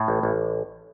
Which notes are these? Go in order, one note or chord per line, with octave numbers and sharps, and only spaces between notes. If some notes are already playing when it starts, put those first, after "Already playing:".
Already playing: A2
A1
A1